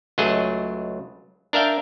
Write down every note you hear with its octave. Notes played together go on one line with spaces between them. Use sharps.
C#2 F#3 A3 G#4 D#5
D4 A#4 E5 F5 G5